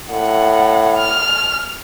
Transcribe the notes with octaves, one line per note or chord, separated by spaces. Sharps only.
A2 F#5
F6